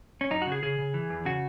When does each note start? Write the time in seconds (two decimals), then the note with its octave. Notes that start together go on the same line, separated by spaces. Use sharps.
0.21 C#4
0.30 F#2 D#4
0.42 C#3 F#4
0.52 G#4
0.63 C#3 G#4
0.79 C#3
0.94 E3
1.10 E2
1.25 C#3 F#4